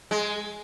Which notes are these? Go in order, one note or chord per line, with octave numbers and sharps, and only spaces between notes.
G#3